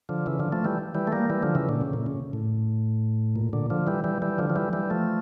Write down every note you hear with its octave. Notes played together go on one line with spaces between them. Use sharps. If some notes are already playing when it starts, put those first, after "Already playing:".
D3 F3
C#3 E3
D3 F3
F3 A3
E3 G3
E3 G3
A3
G3 A#3
E3 G3
D3 F3
C#3 E3
A#2 D3
C#3
A#2
C#3
A2
A#2
A#2 D3
D3 F3
E3 G3
E3 G3
E3 G3
D3 F3
F3
E3 G3
E3 G3
F3 A3